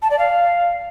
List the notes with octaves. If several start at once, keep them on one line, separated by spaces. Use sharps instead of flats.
A5
D5
F5